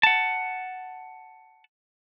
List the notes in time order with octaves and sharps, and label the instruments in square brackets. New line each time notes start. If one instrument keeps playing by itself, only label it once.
[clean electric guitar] F#5 A5